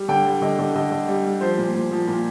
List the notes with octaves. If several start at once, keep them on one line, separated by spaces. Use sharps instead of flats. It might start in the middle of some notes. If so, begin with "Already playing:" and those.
Already playing: G3
D3 G5
G3
D3 D#5
D3
D3 D#5
D3
G3
G3
F3 C5
A#2
A#2
F3
A#2